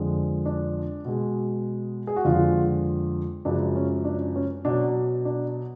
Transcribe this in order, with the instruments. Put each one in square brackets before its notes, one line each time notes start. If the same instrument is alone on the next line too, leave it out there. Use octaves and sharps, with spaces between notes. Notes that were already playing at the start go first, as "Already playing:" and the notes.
Already playing: [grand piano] F2 D3 G#3
D4
B2 G#3
G#4
F#4
F2 D3 G#3 F4
F#2 C#3 F3 G#3 D4
C#4
D4
C#4
B2 F#3 D4
D4